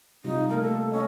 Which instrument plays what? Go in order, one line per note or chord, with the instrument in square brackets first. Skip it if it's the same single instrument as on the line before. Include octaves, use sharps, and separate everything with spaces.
[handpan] C3 G3 F4 [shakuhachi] D#4
[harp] A3 A#3 [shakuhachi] A#4
[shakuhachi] A4
[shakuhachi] C#4 [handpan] D#5